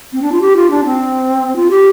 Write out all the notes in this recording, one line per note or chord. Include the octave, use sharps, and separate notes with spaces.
C4
D4
F4
G4
F4
D4
C4
F4
G4